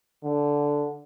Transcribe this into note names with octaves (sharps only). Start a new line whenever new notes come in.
D3